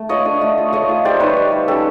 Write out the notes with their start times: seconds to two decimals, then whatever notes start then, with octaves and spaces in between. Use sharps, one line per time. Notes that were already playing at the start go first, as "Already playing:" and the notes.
Already playing: A3
0.09 F4 C#5 D#5
0.25 D4
0.41 A3
0.58 F4
0.73 A3 C#5 D#5
0.89 F4
1.05 G3 C5 D5
1.20 D#4 B4 C#5
1.37 G3
1.52 G3
1.68 C#4 G4 A4